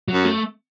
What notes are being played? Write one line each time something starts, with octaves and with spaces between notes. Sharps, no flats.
F#3
F#2
A3